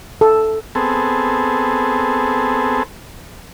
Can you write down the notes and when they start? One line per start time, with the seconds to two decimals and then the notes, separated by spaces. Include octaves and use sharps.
0.21 A4
0.75 B3 C4 G#4 A4